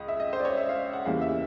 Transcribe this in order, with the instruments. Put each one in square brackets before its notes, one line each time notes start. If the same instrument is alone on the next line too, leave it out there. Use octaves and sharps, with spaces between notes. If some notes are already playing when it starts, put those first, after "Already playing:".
Already playing: [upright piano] C#2 D#5
E5
D#5
C5
D5
C#5
E5
F5
F#5
E2 C#3 E3 G3 A#3 F5
E5